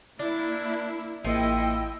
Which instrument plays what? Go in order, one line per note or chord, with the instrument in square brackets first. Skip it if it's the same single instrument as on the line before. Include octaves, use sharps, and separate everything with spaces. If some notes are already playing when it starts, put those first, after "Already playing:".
[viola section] A#3 E4 [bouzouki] D4
[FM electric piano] A1 A#3 C#7 [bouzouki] F3 [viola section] E4 D#5 [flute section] G5 E6